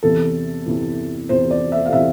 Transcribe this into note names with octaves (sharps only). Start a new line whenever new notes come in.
E2 C3 E3 A4
E2 C3 E3
E2 C3 E3 C5
D5
E5
F5
C3 E3 E5